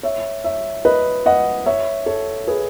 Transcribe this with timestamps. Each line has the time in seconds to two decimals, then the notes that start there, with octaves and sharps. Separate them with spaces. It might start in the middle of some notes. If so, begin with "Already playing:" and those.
0.03 C#5 E5
0.44 C#5 E5
0.85 B4 D#5
1.26 D#5 F#5
1.66 C#5 E5
2.06 A4 C#5
2.48 G#4 B4